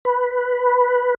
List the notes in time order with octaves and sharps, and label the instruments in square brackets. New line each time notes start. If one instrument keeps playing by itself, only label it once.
[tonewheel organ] B4